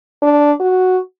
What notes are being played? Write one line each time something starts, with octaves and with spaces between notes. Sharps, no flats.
D4
F#4